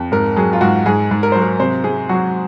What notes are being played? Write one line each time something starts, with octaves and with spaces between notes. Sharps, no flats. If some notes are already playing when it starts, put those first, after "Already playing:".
Already playing: F2
G#2 A#4
F#3 G#4
F4
G#2 F#4
G#2 G#4
G#2
A#4
F#3 C5
A#4
C3 C5
C3 G#4
F#3 F#4